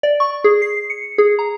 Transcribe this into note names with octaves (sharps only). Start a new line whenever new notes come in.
D5
C#6
G#4
C7
C#7
G#4
A#5